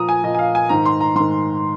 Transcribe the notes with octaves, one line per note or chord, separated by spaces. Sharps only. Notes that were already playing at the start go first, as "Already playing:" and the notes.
Already playing: A#2 F3 A#5 D#6
G#5
A#2 F3 D#5
G#5
F5
G#5
G#2 D#3 A#5
C6
A#5
G#2 D#3 C6